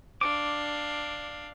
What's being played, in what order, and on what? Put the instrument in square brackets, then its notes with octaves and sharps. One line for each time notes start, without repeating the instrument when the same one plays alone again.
[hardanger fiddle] D4 F5 [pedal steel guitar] D6